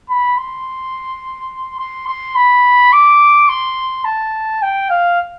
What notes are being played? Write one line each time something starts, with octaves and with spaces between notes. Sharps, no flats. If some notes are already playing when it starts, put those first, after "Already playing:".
B5
C6
C6
C6
B5
D6
C6
A5
G5
F5